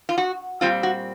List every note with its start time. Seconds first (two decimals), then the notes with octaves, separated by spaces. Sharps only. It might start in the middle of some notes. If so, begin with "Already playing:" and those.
0.09 F4
0.18 F#4
0.61 A#2 G3 C4 F4
0.83 F#4